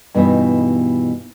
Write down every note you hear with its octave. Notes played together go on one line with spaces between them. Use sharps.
G2 B2 E3 B3 D#4